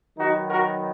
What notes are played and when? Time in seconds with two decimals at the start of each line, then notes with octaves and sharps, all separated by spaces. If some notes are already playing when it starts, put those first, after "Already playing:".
0.17 D#3 F#3 B3 D#4 F#4
0.49 F#4 A#4